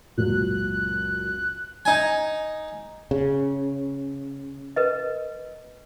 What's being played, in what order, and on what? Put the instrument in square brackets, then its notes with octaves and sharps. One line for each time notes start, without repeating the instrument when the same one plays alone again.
[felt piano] C#2 F#2 A#2 [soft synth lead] F#6
[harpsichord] D#4 G#5
[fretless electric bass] C#3
[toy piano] A#4 B4 D#5